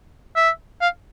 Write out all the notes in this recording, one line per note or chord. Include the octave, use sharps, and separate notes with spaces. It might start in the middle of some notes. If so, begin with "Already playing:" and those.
E5
F5